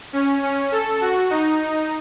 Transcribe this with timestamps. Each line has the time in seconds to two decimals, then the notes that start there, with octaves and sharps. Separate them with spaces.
0.13 C#4
0.43 C#4
0.72 A4
1.01 F#4
1.30 D#4